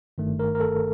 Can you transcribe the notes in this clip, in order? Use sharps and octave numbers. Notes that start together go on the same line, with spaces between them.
G1 G2 D#3 A3
A#4
A#4
A4